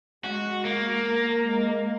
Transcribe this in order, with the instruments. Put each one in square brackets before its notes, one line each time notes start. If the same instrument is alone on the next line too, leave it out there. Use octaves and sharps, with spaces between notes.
[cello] G#3 [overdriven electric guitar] F#4
[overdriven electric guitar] A#3 [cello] A#4
[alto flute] G#3